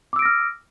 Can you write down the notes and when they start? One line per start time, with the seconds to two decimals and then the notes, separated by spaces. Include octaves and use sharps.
0.13 D6
0.16 E6
0.19 D7
0.22 A#6
0.25 F6